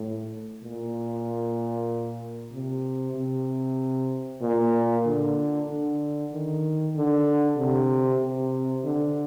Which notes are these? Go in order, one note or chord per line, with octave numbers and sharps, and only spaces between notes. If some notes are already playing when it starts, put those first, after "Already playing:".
Already playing: A2
A#2
C3
C3
A#2
D3
D3
D#3
D3
C3
C3
D3